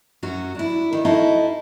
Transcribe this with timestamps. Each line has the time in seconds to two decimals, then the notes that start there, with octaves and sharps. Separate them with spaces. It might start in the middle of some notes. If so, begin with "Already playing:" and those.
0.23 F#2 F#3 C#4 F#4
0.55 D4 E4
0.93 D#3
1.05 D#4 E4 F#4 A4 D#5 F5